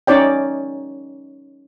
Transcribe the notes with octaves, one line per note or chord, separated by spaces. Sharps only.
C#4 D#4 C#5 D5 G5